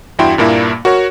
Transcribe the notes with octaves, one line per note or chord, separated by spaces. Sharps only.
E2 G2 E4 F#4 G5 C6
G2 A#2 A#3 D4 E4
F#4 A#4 C#5 C#6